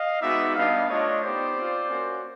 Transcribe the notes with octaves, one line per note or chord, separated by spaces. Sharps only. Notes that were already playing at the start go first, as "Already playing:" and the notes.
Already playing: D#5 F5
G#3 B3 D#4 F#4 D5 E5
G3 B3 D4 D#5 F5
A3 D4 F4 C#5 D#5
B3 D#4 G4 C5 D5
C4 F4
A#3 C#4 F#4